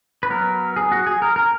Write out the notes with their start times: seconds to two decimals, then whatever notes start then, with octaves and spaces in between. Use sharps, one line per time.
0.23 B4
0.30 F#3 B3 A#4
0.76 G#4
0.92 F#4
1.06 G#4
1.22 A#4
1.36 A#4